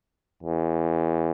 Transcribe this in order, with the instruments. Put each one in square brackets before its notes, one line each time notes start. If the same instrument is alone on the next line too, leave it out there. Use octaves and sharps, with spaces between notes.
[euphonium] E2